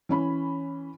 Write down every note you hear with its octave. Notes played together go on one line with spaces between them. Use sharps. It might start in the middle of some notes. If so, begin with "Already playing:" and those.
E3 C#4 B5